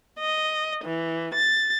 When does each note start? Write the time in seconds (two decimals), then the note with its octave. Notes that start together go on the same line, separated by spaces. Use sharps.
0.19 D#5
0.83 E3
1.34 A6